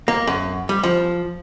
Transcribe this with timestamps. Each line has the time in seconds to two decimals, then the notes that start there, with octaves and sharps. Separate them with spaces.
0.08 A#3
0.27 F#2
0.69 G3
0.84 F3